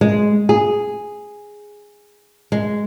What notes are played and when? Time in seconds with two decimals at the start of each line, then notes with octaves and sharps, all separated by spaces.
0.01 G#3
0.49 G#4
2.52 G#3